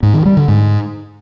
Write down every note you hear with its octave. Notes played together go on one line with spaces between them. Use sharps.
G#2
D#3
G3
D3
G#2